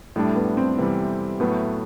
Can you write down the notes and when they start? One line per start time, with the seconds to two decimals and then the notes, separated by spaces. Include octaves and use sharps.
0.16 A2 G3 A3 D4
0.36 B3
0.57 C4
0.78 C3 E3 G3 B3
1.40 A2 F#3 A3 B3